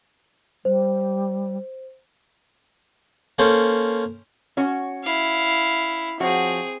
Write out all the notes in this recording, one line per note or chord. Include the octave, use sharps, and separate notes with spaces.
G3 C5
A#3 C#4 A4 C5
C#4 F#4 C#5
E4 F5
F3 C4 F#4 G#4 C#5